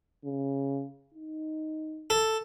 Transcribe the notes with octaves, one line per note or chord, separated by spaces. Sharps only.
C#3
D#4
A4